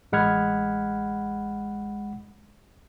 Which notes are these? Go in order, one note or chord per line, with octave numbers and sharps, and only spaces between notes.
A1 G#3 F#5 B5 F6 G#6